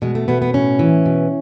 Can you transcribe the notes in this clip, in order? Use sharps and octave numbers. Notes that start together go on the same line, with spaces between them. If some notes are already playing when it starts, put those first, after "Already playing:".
B2 G#3
A3
B2 B3
B3
A2 C#4
E3
B2